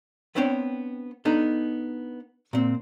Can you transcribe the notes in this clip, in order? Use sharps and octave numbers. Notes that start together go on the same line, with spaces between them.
B3 C4 D4 C5 C#5 G5
B3 D4 D#4 A4 A#5
A#2 C4